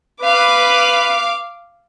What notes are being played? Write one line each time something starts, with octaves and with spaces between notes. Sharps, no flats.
B4 F5 D6